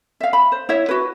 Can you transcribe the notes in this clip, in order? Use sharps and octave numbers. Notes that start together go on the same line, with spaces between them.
E5 F5
B5
C5
E4 C#5 E5
F#4 B4